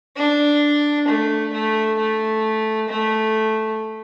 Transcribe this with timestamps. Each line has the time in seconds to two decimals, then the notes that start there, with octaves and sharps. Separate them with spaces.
0.17 D4
1.07 A3
1.53 A3
1.98 A3
2.88 A3